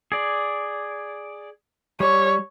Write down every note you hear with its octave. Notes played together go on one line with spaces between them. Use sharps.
G#4 D5
G3 C#5